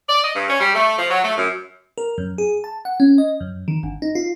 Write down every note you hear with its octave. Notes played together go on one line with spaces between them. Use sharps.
D5
D#5
G2
C#4
G3
A3
F3
F#3
A3
F#2
A#4
F#2
G#4
A5
F#5
C#4
D#5
F#2
D#3
G1
D#4
F4